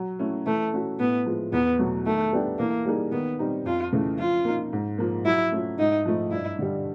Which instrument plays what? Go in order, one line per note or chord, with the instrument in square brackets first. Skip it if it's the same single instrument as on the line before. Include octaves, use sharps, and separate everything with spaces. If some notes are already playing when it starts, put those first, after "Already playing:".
Already playing: [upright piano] F#3
A3 C#4 E4
[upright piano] E3 [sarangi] A3
[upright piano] A3 C#4 F#4
[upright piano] A2 [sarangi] B3
[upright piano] F3 G#3
[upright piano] E2 [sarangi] B3
[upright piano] B2 F#3 A3
[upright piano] D#3 [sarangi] A3
[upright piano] G3 B3 D4 G4
[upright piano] E3 [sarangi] A#3
[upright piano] G3 A#3 D#4 G#4
[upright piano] D#3 [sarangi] B3
[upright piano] G3 C4 D#4
[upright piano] F2 [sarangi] F4
[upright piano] C#3 E3 A3
[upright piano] F3 [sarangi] F4
[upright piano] A#3 D#4
G#2
F3 A#3
[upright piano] F#3 [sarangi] E4
[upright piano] A3 C#4 F4
[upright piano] G#2 [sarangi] D#4
[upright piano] F3 A3
[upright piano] G2 [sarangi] E4
[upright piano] D3 G3